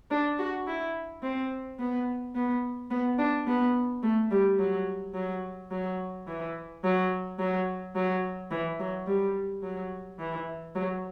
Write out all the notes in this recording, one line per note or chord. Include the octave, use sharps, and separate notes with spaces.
D4
F#4
E4
C4
B3
B3
B3
D4
B3
A3
G3
F#3
F#3
F#3
E3
F#3
F#3
F#3
E3
F#3
G3
F#3
E3
F#3